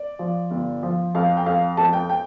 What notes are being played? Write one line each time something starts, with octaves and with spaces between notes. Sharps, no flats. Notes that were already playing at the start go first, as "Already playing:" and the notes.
Already playing: D5
F3
G1
F3
F2 F5
G5
F2 F5
F2 A5
G5
G5